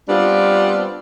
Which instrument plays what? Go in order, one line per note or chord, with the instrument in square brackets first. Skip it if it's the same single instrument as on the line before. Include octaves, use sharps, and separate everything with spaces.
[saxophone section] G3 B3 C4 D4 F4